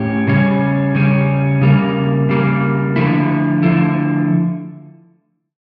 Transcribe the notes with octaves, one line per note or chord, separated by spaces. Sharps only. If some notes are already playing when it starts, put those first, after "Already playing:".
Already playing: A2 C#4 G4
C#3 G3 C#4
C#3 G3 C#4
C#3 G3 A#3
C#3 G3 A#3
D3 F3 A3 E4
D3 F3 A3 E4